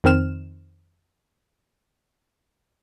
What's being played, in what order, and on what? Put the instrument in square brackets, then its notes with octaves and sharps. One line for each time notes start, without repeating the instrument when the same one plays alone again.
[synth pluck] F2 D#3 C4 F6 E7